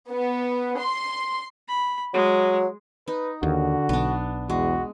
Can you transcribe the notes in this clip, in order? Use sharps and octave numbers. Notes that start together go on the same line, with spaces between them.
B3
C6
B5
F#3 G#3
D#4 B4
D#2 D3 F#4
B1 B3 D4
E2 G#3 F#4